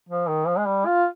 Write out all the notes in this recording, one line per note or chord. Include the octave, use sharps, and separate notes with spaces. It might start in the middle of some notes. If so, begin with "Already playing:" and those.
F3
D#3
F3
G#3
G3
F4